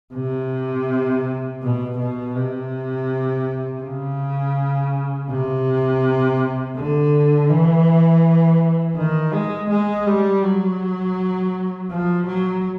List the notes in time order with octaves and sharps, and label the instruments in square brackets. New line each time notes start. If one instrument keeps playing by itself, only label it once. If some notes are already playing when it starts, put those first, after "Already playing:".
[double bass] C3
B2
B2
C3
C#3
C3
D3
E3
D#3
G#3
G#3
G3
F#3
F3
F#3